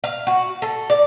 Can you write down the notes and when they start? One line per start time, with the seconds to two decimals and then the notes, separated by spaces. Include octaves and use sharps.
0.04 F5
0.27 F#4
0.62 A4
0.90 D5